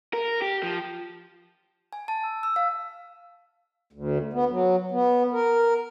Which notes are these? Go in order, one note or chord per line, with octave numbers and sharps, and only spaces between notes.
A#4
G4
F3
G#5
A5
E6
E6
F5
D2
B3
F#3
B3
A#4